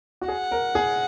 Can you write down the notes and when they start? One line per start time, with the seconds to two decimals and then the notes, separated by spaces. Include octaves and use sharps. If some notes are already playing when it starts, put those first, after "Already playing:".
0.21 F#4
0.28 G#4 F#5
0.51 A#4
0.75 G#4